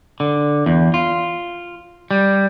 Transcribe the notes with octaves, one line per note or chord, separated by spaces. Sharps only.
D3
E2
F4
G3